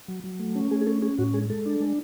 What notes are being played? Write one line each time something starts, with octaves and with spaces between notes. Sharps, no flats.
F#3
F#3
A3
C#4
A3 G#4
G#4
C#4 A4
C#4 G#4
A2 F#4
G#3 G#4
G#3 A4
D4
G#3